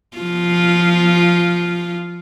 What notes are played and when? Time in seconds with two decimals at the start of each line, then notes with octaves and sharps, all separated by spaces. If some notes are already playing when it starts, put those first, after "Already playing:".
0.17 F3 F4